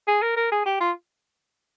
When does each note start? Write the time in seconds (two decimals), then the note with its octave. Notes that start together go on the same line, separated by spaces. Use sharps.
0.08 G#4
0.22 A#4
0.37 A#4
0.52 G#4
0.66 G4
0.80 F4